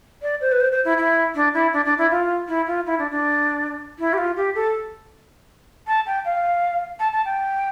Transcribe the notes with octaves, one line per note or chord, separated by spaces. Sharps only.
D5
C5
B4
C5
C5
E4
E4
D4
E4
D4
D4
E4
F4
E4
F4
E4
D4
D4
E4
G4
F4
G4
A4
A5
G5
F5
A5
A5
G5